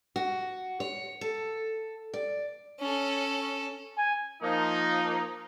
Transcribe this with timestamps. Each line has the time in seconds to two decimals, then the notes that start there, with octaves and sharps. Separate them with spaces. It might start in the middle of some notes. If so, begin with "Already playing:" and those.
0.16 F#4
0.80 C#5
1.21 A4
2.14 D5
2.80 C#4 A4
3.98 G#5
4.43 F3 A#3 D#4